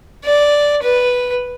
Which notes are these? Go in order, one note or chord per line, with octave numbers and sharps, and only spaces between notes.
D5
B4